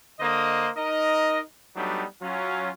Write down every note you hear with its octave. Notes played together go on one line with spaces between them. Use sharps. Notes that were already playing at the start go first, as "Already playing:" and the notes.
D3 A#3 C5 D#5
D#4 A#4 D#5
F#3 G3 A3 B3 D4 D#4
F#3 C#4 F4